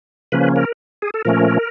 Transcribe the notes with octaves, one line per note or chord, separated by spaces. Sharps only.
C#3 F3 A#3 C#4 B4
A#4
G#4
A4
A#2 F3 A3 C#4 A#4